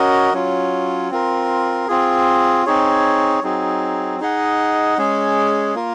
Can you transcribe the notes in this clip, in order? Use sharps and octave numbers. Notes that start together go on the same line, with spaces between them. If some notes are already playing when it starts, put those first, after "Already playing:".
Already playing: C#4 F#4 A#4 D#5
F#3 C#4 F4
C4 F4 A#4
C4 F4 G#4
C4 D#4 G#4 C#5
F#3 C4 D#4 G#4
D#4 G#4 D#5 F#5
G#3 C#4 G#4
A#3 F4 A#4